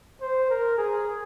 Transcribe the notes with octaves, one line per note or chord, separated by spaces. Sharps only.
C5
A#4
G#4